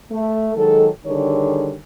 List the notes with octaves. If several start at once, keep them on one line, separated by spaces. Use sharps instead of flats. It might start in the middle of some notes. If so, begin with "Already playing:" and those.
A3
D#3 F#3 G#3 A4
D3 D#3 G3 G#4 C#5